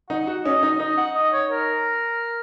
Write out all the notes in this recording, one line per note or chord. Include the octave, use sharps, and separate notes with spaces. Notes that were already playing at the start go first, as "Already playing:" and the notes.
D#4 F#5
F#4
C#4 D#5
D#4
D#4 D#5
F#5
D#5
C#5
A#4